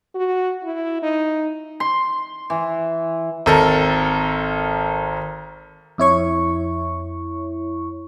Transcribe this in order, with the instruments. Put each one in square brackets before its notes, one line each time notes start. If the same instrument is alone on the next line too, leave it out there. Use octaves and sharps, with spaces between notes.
[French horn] F#4
E4
D#4
[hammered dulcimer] C6
E3
[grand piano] G#1 A4 A#4
[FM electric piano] F2 E4 C#5 C#6